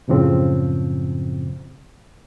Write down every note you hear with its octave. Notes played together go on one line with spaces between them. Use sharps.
F#2 A2 C#3 F3 C4